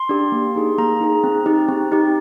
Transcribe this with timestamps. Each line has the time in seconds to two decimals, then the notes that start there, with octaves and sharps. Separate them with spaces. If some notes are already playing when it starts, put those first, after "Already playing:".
Already playing: C6
0.09 D4 G4
0.32 A#3
0.55 D#4 G#4
0.78 A#3 A#5
1.01 D#4 G#4
1.24 C4
1.46 D#4 G4
1.68 C4
1.92 D#4 G4